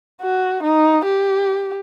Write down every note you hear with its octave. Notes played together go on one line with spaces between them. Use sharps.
F#4
D#4
G4